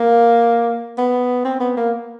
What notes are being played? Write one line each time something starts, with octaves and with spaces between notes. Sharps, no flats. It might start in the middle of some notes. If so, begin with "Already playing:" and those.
Already playing: A#3
B3
C4
B3
A#3